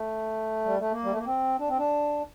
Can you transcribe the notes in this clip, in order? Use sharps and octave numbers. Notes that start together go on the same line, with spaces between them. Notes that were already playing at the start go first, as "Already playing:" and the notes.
Already playing: A3
G3
A3
A#3
G3
A3
A#3
C4
D4
C4
D4